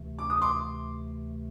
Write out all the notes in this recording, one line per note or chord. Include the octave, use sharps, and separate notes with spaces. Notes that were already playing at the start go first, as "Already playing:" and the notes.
Already playing: D2 C3 E3 A3
D6
D#6
C6 D6